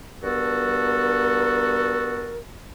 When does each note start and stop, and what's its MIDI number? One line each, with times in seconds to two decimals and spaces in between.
0.24 2.40 43
0.24 2.40 59
0.24 2.40 66
0.24 2.40 69
0.24 2.40 70